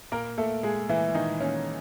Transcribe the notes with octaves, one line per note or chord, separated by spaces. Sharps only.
A#2 A#3 A#4
A#2 A3 A4
A#2 G#3 G#4
A#2 E3 E4
A#2 D#3 D#4
A#2 C#4